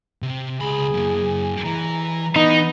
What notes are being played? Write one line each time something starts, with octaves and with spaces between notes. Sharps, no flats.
C3
C#2 G#4 B5
F#2 A#3
E3 A#5
E3 B3 D#4